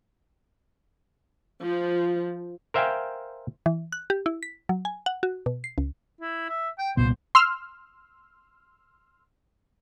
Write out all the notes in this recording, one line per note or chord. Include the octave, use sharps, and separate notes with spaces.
F3
A#4 C5 E5 F5 G5 G#5
E3
F#6
G4
E4
B6
F#3
G#5
F#5
F#4
B2
C7
C#2
E4
E5
G5
C2 A#2 B3 C5
C6 E6 F6